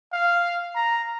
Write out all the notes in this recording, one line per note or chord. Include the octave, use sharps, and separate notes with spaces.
F5
A#5